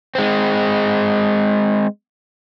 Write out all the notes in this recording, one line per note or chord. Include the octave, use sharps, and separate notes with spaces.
G#3 C4